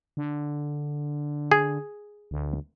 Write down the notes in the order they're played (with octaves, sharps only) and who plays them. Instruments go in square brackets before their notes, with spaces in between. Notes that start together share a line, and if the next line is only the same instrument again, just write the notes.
[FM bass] D3
[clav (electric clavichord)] G#4
[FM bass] D2